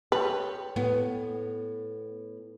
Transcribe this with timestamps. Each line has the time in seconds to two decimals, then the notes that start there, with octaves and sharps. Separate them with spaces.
0.12 G4 B4 C#5
0.76 A2 B3